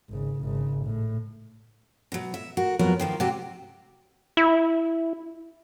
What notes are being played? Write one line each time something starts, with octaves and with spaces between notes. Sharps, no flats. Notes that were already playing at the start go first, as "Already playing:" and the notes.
G#1 C#3
G#1 C#3
A2
B2 F#3
E5
F#4 A#4
F2 F#3 B3 A#4
D#3 F3 A#3
C3 F#4 G4
E4